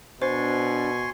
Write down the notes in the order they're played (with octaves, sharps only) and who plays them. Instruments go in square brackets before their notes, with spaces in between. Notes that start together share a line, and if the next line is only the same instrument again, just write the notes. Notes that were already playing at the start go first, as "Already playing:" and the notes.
[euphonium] B2 [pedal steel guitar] D4 [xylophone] C5 [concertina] G#5 C6 C#6